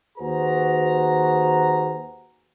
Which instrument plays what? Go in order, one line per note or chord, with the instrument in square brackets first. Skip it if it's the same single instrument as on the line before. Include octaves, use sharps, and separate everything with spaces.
[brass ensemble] D#2 F#4 G#4 B4 C5 A#5